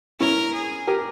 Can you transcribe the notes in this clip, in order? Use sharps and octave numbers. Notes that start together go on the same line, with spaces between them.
C#4 E4 A#4
G#4
G4 A#4